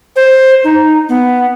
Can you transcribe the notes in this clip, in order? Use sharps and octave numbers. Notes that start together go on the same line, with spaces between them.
C5
D#4
B3